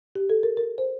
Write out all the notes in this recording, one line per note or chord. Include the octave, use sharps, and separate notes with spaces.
G4
A4
A#4
A#4
C5